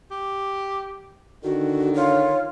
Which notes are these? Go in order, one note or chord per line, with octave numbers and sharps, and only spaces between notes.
G4
D3 D#3 F#4
F4 C#5